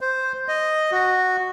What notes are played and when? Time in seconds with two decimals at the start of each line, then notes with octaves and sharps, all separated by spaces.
0.01 C5
0.48 D#5
0.92 F#4